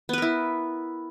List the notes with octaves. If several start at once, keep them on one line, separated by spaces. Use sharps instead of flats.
B3 E4 A#4 B4